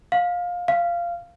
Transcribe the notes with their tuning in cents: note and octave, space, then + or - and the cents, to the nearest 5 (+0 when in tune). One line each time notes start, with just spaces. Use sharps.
F5 +20
F5 -15